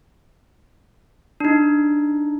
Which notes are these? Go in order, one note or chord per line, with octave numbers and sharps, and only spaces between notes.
D4 D#4